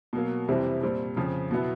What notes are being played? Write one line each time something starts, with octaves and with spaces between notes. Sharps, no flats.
B2 F#3 A#3
F2 C3 E3 G3 C4
A#2 G3 C4
F2 C#3 F3
B2 F#3 B3 E4